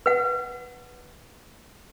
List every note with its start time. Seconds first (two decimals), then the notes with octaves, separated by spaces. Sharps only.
0.06 B4 F#5